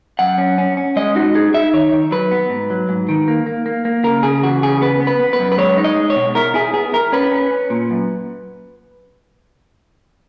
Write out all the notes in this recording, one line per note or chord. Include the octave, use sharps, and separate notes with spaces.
F#2 F#5
C#4
C#4
C#4
G#3 D#5
D#4 F#4
D#4 G#4
D#4 E5
D#3 C#5
D#3
F#3 B4
B3
G#2
F#3
G#2
D#3
A#3
A#3
A#3
A#3
C#3 A#4
C#3 G#4
E3 F#4
C#3 G#4
B3 B4
B3
B4
B3
B4
F#2
B4
G#3 C#5
D#4
D#5
G#3
C#5
B2
E4 A#4
E4 G#4
B3 G#4
E4 A#4
C#4 B4
C#4
C#4
A#2
F#2